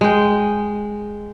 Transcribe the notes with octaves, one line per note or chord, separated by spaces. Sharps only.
G#3 G5